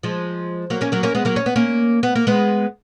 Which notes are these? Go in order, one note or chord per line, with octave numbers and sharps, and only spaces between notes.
F3 G#3
F#3 A#3
A#3 C#4
F#3 A#3
A#3 C#4
G#3 B3
F#3 A#3
C#4
B3
A#3 C#4
B3
A#3
G#3 B3